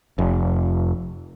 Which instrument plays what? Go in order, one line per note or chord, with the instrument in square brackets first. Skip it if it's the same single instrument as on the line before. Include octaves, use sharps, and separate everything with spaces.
[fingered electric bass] F1